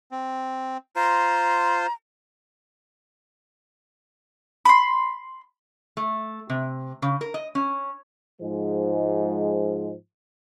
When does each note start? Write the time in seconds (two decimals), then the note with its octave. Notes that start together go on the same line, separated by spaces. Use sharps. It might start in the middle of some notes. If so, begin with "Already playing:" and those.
0.11 C4
0.96 F4 C5 A#5
4.65 B5 C6
5.97 A3
6.50 C3
7.02 C#3
7.21 A#4
7.34 D#5
7.55 C#4
8.42 G#2 F3 G#3